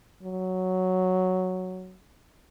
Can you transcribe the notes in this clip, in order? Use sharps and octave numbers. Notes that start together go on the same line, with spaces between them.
F#3